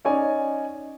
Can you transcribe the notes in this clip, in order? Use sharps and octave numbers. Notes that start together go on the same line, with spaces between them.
C#4 D#4 C#5 D5 G#5